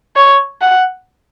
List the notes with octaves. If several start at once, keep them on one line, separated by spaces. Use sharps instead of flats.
C#5
F#5